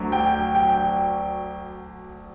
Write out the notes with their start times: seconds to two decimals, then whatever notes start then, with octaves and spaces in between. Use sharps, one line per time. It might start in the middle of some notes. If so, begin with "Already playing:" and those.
Already playing: D2 D3 F#3
0.12 G5
0.55 G5